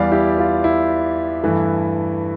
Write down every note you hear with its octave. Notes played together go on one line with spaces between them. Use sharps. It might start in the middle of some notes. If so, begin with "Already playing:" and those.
Already playing: E2 E3 G3 D5 F5
E4 G4
F4
E4
G2 E3 A3